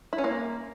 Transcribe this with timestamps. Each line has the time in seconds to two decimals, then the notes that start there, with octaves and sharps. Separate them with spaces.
0.13 E4
0.18 C#4
0.24 A#3